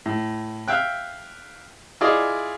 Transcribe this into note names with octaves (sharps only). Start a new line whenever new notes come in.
A2
E5 F5 G5 F#6
E4 F4 G#4 D5 D#5